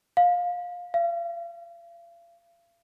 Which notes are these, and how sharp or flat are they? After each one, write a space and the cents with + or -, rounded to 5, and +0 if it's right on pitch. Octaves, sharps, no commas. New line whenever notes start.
F5 +20
F5 -40